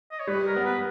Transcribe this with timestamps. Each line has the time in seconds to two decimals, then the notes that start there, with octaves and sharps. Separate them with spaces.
0.12 D#5
0.20 C#5
0.27 G3 B4
0.47 A#4
0.56 B3
0.65 B4